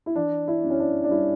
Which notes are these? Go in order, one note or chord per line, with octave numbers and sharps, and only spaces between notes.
E4
E3 D4
E4
F#2
C#4
D4
D4
G3 E4